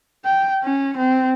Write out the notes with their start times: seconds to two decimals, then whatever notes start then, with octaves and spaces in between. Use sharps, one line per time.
0.25 G5
0.64 C#4
0.97 C4